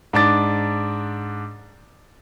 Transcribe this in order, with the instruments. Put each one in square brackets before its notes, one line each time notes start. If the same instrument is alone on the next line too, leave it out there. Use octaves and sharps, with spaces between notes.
[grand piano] G#2 D4 D6 A6